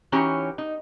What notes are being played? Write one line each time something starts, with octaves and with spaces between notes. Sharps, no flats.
E3 C#4 D#4 F#4 G4 C#5
D#4